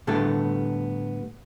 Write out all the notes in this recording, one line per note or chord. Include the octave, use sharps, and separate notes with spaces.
A2 D3 G3 A3 B3 A4